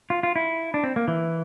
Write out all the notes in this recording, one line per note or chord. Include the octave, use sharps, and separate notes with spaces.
F4
F4
E4
D4
C4
A#3
E3